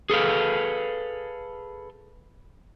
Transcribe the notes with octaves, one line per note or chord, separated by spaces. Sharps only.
G#4 A4 B4 F5